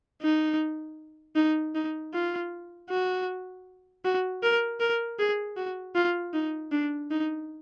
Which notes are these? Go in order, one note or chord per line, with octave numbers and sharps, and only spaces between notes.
D#4
D#4
D#4
F4
F#4
F#4
A#4
A#4
G#4
F#4
F4
D#4
D4
D#4